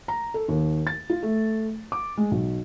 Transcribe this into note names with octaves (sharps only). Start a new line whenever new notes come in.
A#5
A4
D#2
A6
F4
A3
D6
G#3
B1